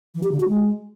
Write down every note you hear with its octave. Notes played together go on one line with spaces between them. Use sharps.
E3
G4
D3
F#4
G#3